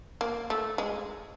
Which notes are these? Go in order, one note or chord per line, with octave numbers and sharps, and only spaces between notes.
A#3
A3
G#3